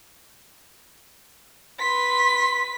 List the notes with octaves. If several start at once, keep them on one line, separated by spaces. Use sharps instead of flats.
B4 C6 B6